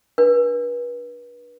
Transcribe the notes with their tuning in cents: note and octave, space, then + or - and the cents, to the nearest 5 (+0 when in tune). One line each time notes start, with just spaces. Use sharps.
D4 +5 B4 -35